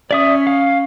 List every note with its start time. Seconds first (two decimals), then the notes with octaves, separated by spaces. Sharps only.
0.11 C#4 D5 E5 D#6
0.47 F5